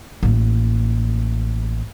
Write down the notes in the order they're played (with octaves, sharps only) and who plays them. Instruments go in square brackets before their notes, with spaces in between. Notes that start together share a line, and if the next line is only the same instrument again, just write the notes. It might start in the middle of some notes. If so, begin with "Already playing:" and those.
[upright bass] A1 A#3